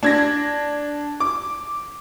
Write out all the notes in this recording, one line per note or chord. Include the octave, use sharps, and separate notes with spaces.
D4 G#6 A#6
D6